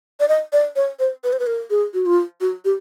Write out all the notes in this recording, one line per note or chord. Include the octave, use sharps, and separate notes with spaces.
D5
D#5
D5
C#5
C5
B4
C5
B4
A#4
G#4
F#4
F4
F#4
G4